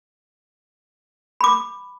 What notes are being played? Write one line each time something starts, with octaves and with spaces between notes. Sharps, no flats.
B5 D6